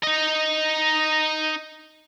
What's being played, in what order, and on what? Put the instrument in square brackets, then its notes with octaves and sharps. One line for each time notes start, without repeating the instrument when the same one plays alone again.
[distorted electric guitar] D#4 D#5